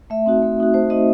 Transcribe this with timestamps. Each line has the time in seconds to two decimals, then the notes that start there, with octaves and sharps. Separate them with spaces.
0.10 A3 E5
0.26 C4 D#4 F#4
0.42 A3
0.59 C4 D#4 F#4
0.74 A3 C5
0.90 C4 D#4 F#4 D#5